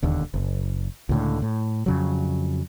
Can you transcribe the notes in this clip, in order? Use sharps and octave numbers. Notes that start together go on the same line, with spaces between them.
E1 D#2 D3
F#1
C#2 A2 D3
A2
F2 C#3 F#3